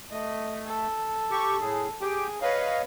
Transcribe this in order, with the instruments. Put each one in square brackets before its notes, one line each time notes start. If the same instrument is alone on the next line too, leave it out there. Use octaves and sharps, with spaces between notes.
[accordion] A3 [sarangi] D#5
[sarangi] A4
[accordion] G4 C#6
A2 G#4
[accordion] G4 G5 [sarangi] G#4
[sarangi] B4 [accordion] C#5 D#5 F5